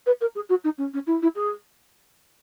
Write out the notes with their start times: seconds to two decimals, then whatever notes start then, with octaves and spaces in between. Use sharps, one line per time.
0.06 B4
0.21 A#4
0.35 G#4
0.49 F#4
0.64 D#4
0.78 C#4
0.93 C#4
1.07 E4
1.22 E4
1.35 G#4